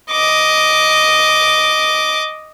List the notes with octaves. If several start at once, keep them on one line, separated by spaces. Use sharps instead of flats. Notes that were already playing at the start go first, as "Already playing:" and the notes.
D#5 D6